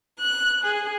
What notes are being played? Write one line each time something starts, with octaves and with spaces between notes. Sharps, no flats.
F#6
G#4